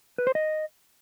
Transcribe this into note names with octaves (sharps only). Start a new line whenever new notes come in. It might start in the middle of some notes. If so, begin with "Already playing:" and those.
B4
C5
D#5